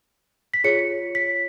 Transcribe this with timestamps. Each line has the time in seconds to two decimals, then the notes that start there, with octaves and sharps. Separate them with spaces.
0.54 B6
0.64 F4 G#4 C#5 C#7
1.15 B6